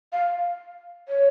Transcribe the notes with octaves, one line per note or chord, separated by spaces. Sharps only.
F5
C#5